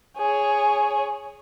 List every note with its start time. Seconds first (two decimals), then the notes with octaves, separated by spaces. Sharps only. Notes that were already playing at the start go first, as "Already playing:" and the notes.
0.17 G#4 C#5